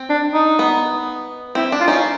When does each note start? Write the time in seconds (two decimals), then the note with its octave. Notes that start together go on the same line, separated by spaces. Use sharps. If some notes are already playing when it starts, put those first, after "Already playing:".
Already playing: C4
0.09 D4
0.34 D#4
0.59 B3
1.55 C4 E4
1.72 D4
1.80 F4
1.88 C#4 D#4